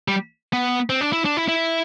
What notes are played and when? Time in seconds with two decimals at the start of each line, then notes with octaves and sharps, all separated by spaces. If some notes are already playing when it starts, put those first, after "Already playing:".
0.08 G3
0.53 B3
0.90 C4
1.01 D4
1.13 E4
1.25 D4
1.37 E4
1.48 E4